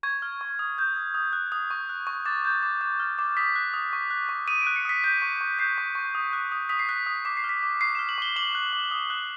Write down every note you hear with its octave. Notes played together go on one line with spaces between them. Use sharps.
C#6 G#6
F6
C#6
D#6
G6
D#6
D#6
F#6
D#6
C#6
F#6
C#6
D6 A6
G6
D6
D6
F6
D6
D#6 B6
F#6
D#6
C#6
F#6
C#6
D#6 D#7
D7
F#6
C#7
D#6 B6
G6 B6
C#6
C#6
G6 C7
C#6
C#6
D#6
F#6
D#6
D#6 B6
C7
F#6 B6
D#6
D6 B6
C7
F6
B6
D6
C#6 C7
F6 E7
F#7
C#6 G7
D6 F#7
F#6
D6
D#6
F#6